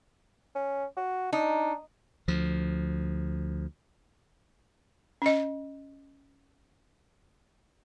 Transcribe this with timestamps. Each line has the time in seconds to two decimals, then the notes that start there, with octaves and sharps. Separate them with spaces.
0.55 C#4
0.97 F#4
1.33 D4 D#4
2.28 D2 F3
5.22 C#4 D#5